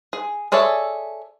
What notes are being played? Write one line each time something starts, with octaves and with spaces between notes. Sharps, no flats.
G#4
G#4 A4 C#5 D5 E5